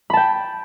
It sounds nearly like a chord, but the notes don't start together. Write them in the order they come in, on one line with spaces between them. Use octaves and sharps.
B5 A5 G5